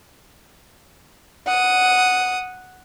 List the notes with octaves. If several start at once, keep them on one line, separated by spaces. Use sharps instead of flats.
F#5 D#6